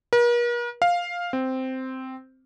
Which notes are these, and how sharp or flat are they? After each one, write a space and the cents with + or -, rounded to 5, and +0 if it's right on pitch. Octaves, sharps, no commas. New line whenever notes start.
A#4 +45
F5 +5
C4 -5